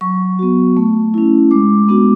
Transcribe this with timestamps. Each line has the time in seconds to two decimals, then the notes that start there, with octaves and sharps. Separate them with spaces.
0.01 F#3 C#6
0.39 B3 F#4
0.77 A3
1.14 C#4 E4
1.51 G#3 D6
1.88 B3 D4 F#4